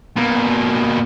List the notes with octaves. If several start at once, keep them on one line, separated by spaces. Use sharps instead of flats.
B2 A#3